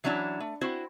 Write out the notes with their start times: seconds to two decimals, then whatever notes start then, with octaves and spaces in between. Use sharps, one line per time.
0.04 E3 F#3 C#4 D4 E4
0.40 A3
0.61 C4 E4 F#4 C5